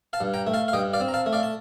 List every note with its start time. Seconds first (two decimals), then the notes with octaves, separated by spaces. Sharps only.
0.13 F5 A5
0.21 G2
0.34 G5 A#5
0.47 A3
0.54 F5 A5
0.68 F5
0.73 G2 D#5 G5
0.93 D5 F5
1.00 C4
1.08 A#5
1.14 F5 A5
1.26 A3
1.33 D5 F5
1.43 A5